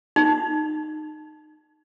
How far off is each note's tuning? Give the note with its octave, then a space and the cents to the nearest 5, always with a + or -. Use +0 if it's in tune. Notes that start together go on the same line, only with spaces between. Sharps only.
D#4 -15